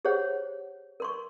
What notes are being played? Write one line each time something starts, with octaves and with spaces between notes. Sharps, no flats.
G4 G#4 C5 C#5 F#5
A#4 C6 C#6